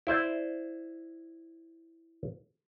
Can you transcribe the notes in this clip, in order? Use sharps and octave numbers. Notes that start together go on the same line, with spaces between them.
E4 C5 D5